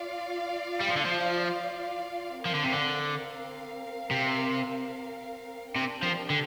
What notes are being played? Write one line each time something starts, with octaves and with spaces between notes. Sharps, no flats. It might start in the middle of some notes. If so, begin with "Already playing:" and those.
Already playing: F4 D5 F5
G3
F3
D3
F3
F3 C4 A#4 F5
D3
C3
D3
C3
C3 D4 G4 A#4 G5
F3
D3